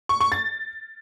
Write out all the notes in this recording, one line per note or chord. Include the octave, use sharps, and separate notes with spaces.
C#6
C#6
A6